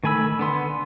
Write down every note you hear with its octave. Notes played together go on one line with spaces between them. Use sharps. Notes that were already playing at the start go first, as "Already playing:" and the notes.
D#3 A3 G#5 B5 E6
D3 B3 C6